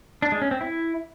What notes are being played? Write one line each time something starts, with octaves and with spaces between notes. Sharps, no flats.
D4
G#3
C#4
C4
E4